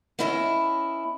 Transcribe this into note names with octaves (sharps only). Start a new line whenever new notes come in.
B3 C#4 E4 D#5 E5